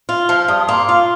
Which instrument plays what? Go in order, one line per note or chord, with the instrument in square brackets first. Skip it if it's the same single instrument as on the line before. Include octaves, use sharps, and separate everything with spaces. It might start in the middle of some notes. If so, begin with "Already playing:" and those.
[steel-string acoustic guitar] F4
[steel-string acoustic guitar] F3 [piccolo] F6
[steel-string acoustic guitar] G2 [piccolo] D#6
[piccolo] D#6
[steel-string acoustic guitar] A#3 [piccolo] C6
[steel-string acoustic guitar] F4 [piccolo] F5